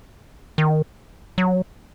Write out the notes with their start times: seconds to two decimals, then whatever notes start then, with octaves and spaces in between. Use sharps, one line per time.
0.58 D#3
1.38 F#3